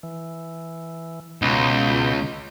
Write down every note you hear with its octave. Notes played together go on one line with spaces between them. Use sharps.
E3
C#2 B2 B3 G6